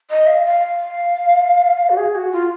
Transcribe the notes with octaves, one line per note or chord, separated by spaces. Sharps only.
D#5
F5
F5
F#4
G#4
F#4
F4